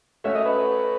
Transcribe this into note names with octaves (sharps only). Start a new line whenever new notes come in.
A3 C#4 F#4 C#5 E5
D#5
B4